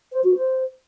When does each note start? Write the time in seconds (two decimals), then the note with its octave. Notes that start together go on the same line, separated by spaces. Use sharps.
0.12 C5
0.24 F#4
0.35 C5